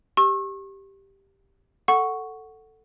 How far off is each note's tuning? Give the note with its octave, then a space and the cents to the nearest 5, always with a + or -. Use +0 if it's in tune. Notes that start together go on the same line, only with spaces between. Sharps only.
G4 +0 C#6 -35 E6 +0
A4 +10 F#5 +0 C#6 +0